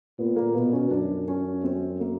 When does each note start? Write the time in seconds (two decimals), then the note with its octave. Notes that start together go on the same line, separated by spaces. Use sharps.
0.19 A#2 B3
0.36 A#3
0.54 B2 B3
0.73 C#4
0.91 F#2 D4
1.28 C#4
1.64 C4
2.00 A#3